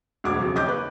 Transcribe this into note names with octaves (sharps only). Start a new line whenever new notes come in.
E1 D2 D6 G#6
F2 C#3 F#3
D#2 D#5 D6 G6
B4